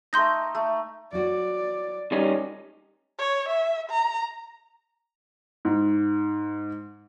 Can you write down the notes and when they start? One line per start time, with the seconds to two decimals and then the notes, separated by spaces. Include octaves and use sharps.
0.13 A3 D#4 C6 G6 A#6
0.55 A3
1.13 F#3 F#4 D5
2.12 G3 C#4 D#4
3.18 C#5
3.49 E5
3.90 A#5
5.65 G#2